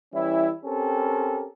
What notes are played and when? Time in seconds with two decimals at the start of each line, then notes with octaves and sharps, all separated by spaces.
0.13 E3 G3 C#4 E4
0.64 C4 C#4 G4 A4 A#4